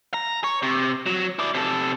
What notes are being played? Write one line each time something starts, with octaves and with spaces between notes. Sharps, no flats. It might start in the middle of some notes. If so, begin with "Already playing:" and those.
A#5
C#5
C3
F#3
E4 D5
C3 A4